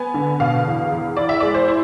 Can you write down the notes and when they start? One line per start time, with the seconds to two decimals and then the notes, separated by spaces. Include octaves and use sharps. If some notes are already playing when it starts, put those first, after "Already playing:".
Already playing: B3 G#5
0.14 D3
0.40 B2 F5
0.66 E2
0.91 E2
1.17 E4 D5
1.29 E5
1.40 G#3 D5
1.54 C5
1.68 E4